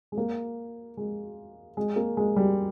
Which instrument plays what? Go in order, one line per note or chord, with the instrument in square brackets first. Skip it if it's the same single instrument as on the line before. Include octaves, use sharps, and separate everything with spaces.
[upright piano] G#3
A#3
G#3
G#3
A#3
G#3
G3